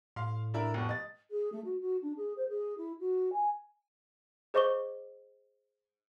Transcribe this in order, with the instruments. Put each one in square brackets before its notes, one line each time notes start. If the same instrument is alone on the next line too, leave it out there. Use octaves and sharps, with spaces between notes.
[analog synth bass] A2 [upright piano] F5 C6
[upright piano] D4 E4 A#4
F1 B2
D#5 A6
[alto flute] G#4
A3
F#4
F#4
D4
G#4
C5
G#4
E4
F#4
G#5
[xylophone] G#4 C5 D#5 C#6 D6 G7